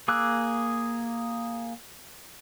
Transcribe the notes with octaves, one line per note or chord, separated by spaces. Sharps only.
A#3 G#4 D6 E6 F#6